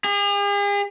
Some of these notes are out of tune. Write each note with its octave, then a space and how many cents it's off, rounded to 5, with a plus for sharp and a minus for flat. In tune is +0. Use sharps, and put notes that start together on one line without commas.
G#4 -45